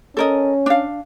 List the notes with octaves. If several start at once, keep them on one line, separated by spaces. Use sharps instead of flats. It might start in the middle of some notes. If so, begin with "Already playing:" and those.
C#4 A4 A#4 D#5
D4 F5